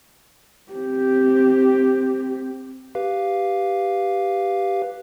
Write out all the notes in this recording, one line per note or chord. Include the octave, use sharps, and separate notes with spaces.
C4 G4
G4 B4 F5